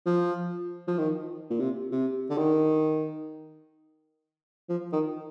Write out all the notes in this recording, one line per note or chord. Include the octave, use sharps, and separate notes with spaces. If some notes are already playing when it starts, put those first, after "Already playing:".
F3
F3
D#3
A#2
C3
C3
D3
D#3
F3
D#3